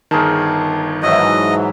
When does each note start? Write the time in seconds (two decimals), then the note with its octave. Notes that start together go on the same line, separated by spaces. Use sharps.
0.11 G1 D#3 G#4 A#4 A5
1.03 G#2 E3 F#3 F#4 D#5 E5